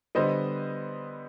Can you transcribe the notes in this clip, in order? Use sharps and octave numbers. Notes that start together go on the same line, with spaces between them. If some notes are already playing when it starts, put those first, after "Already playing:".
D3 G3 B3 C5 D#5